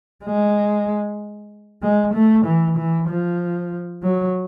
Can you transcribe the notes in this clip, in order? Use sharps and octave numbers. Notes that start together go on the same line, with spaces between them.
G#3
G#3
A3
E3
E3
F3
F#3